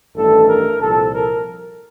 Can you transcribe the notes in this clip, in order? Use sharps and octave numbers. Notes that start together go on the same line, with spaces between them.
A1 G2 D#3 A3 A4
A#4
C2 A#2 F3 A4
A#4